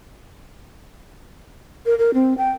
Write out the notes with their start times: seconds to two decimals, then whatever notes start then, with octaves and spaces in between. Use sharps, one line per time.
1.86 A#4
1.99 A#4
2.14 C4
2.38 G5